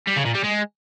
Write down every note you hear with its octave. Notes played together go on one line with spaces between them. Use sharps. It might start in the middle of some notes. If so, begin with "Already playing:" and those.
G3
C#3
A#2
G3
G#3